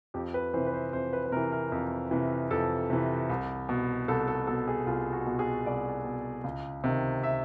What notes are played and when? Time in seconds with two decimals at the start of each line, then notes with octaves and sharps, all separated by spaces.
0.14 F2 G4
0.34 B4
0.53 C3 E3 C5
0.66 B4
0.73 C5
0.93 F2 C5
1.13 B4
1.25 B4
1.32 C3 A#4
1.37 E3
1.52 A#4
1.72 F2
2.11 C3 E3
2.51 F2 A4
2.90 C3 E3
3.30 C2
3.69 B2
4.08 C2 A4
4.28 A4
4.47 B2 A4
4.68 G#4
4.87 C2 F4
5.13 F#4
5.26 B2
5.39 G#4
5.65 C2 D5
6.05 B2
6.44 C#2
6.84 C3 D#3
7.23 E5